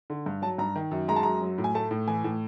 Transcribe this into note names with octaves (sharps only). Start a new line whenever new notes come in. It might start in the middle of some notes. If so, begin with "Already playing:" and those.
D3
G2
F#3 A5
G2 A#5
D#3
F#2
G#3 A#5
A5
F#2 A#5
F#3
A2
G#5
A3 A5
A2
E3 G#5
A2